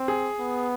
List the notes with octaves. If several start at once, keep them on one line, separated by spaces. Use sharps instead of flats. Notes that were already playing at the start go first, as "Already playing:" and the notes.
Already playing: C4
G#4
B3